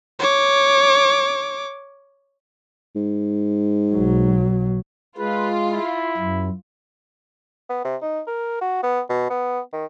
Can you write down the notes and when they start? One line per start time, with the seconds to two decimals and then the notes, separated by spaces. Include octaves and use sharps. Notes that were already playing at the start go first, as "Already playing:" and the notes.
0.19 C#5 D6
2.96 G#2
3.92 B1 F#3
5.18 G#3 F4 B4
5.70 E4
6.17 F#2
7.69 B3
7.84 C3
8.02 D#4
8.27 A#4
8.61 F#4
8.83 B3
9.09 B2
9.30 B3
9.73 D#3